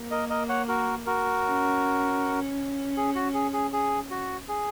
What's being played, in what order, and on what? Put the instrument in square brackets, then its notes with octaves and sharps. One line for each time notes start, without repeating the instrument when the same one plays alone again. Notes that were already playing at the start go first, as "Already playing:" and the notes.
Already playing: [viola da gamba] A#3
[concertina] A#4 D#5
A#4 D#5
C#5 F#5
F#4 A#4
F#4 A#4
[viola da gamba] C#4
[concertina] G#4
F#4
G#4
G#4
G#4
F#4
G#4